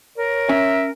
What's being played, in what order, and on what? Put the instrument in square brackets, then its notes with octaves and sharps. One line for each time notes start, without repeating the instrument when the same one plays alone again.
[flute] A#4 [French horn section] C#5
[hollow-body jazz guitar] C#4 G#5 [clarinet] E5